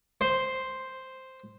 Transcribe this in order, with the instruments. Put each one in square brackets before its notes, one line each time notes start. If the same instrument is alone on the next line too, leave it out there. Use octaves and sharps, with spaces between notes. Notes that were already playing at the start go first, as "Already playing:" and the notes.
[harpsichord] C5